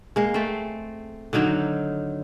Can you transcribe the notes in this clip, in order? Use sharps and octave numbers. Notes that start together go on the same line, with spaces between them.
G#3 A#3
A3 C4
D3 D#3 F#3 D#4